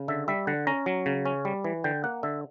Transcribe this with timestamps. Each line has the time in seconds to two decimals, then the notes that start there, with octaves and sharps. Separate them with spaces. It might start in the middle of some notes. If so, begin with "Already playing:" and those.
Already playing: C#3
0.08 D3 E5
0.28 G3 E5
0.47 D3 F#5
0.67 C#4 A#5
0.86 F#3
1.06 C#3
1.26 C#4
1.45 G3
1.64 E3
1.84 D3 G5
2.04 A#3 F#5
2.23 D3 E5